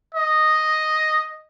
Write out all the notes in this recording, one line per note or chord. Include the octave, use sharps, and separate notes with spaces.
D#5